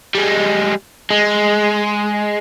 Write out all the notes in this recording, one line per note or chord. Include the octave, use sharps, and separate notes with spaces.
G3 G#3
G#3